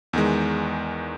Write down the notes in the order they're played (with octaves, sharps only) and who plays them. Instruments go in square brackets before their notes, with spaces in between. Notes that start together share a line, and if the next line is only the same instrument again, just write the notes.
[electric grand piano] E2 D#3 G#3